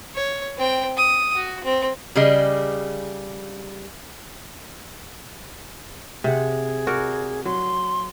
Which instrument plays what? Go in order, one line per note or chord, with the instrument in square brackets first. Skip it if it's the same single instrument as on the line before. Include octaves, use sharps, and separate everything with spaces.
[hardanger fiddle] C#5
C4 G5
D#6
F#4
C4
[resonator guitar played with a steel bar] C#3 G3 G#4 D#5
[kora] C3 F#5 [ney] G#4
[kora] F#4 A#4 D5
[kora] F#3 [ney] C6